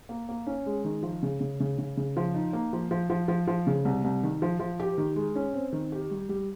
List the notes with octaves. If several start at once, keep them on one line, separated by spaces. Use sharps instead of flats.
A#3
A#3
C#4
G#3
D#3
F3
C#3
C#3
C#3
C#3
C#3
F3
D#4
A#3
F3
F3
F3
F3
F3
C#3
C2
C2
D#3
F3
F3
G4
D#3
G#3
C#4
C4
D#3
G4
G3
G3